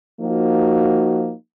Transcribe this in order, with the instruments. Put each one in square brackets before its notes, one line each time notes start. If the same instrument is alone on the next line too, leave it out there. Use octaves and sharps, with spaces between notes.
[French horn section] F3 A#3 D#4 F#4